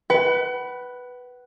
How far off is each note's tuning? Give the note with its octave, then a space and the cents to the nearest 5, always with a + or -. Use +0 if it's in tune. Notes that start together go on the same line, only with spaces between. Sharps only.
B4 +0 F#5 +35